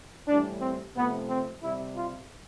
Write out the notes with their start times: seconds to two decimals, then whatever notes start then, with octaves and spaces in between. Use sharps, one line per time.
0.27 A2 E3 G3 D4
0.61 C4
0.95 C3 F3 A3 B3
1.29 C4
1.63 C3 G3 E4
1.96 F4